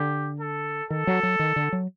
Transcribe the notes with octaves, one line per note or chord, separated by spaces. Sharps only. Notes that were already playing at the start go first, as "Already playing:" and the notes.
Already playing: D3 G4
A4
D#3 A4
F#3
F#3
D#3
D3
F#3